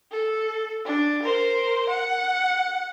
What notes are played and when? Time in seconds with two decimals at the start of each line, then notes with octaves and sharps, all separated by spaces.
0.12 A4
0.85 D4
1.23 A#4 C5
1.90 F#5